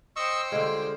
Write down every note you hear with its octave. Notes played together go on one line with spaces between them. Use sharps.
C5 D#5 G5 C#6 E6
D3 G3 G#3 F4